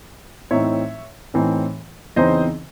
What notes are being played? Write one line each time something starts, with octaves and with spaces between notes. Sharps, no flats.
A2 E3 C4 D#4 C#5 E5
A2 E3 C4 D#4
E2 C#3 E3 C4 D#4 C5 D#5